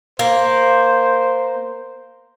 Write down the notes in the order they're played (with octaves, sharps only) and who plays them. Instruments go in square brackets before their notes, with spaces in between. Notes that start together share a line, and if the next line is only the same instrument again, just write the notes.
[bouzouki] A#3 [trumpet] C5